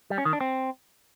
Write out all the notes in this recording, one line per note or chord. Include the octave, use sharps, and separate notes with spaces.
G3
C#4
D#3
D4
C4